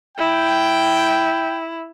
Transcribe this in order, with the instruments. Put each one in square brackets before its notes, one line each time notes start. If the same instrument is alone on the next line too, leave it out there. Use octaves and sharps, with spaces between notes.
[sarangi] E4 [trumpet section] G5